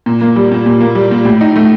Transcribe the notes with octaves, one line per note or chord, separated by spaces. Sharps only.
A#2
A#3
G3
A#2
A#2
A#3
G3
A#2
A2
D#4
A3